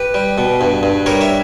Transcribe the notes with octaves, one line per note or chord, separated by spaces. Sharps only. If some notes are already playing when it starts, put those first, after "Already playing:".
Already playing: G4 B4
G3
B2
G2
G2
G3 A#4 C#5
C#5 E5